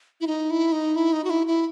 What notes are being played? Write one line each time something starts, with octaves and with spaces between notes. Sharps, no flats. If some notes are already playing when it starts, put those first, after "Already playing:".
E4
D#4
E4
D#4
E4
D#4
F#4
E4
E4